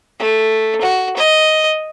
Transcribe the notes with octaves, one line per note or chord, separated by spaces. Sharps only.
A3
F#4
D#5